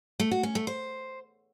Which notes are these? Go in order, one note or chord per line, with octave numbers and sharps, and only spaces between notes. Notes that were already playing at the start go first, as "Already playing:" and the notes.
A3
F#4
C#4
A3
C5